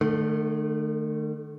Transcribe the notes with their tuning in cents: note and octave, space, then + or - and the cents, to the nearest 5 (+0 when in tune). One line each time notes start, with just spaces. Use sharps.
D#3 -45 A3 +0